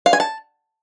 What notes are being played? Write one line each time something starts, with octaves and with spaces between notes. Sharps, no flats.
F5
G#5
A5